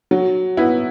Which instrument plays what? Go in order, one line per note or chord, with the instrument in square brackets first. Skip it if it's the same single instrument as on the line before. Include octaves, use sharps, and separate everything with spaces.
[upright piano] F#3
B3 E4